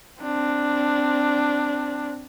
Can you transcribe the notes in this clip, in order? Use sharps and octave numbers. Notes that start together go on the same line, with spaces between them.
C4 D4